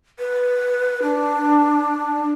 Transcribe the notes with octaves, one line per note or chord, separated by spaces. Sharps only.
B4
D4